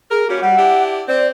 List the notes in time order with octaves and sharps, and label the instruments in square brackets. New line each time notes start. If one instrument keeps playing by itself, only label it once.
[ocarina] G#4 [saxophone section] A#4
[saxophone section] G3 A#3 C#4 [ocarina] F#4
[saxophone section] G3 [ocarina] F#5
[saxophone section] D4 E4 G4
[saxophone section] C4 [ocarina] D5